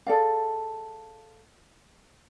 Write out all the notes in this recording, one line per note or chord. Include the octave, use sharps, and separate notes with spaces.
G#4 A4 D5 F5